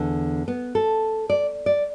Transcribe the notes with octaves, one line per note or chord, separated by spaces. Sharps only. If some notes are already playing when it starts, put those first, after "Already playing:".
Already playing: E2 D3
B3
A4
D5
D5